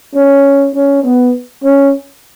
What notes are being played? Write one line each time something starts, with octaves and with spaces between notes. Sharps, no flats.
C#4
C#4
B3
C#4